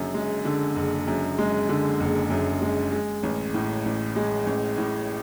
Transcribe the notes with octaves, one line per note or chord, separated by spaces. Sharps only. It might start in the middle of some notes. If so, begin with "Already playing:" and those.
Already playing: F#1 F#2 D3
G#3
D3
F#1
F#2
G#3
D3
F#1
F#2
G#3
G#3
A1
A2
A1
G#3
A1
A2